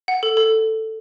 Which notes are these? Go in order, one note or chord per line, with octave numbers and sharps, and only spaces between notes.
F#5
A4
A4